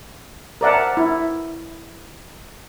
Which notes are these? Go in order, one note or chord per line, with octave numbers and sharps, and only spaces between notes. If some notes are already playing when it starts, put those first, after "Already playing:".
A#4 C5 D5 E5 F#5 A5
E4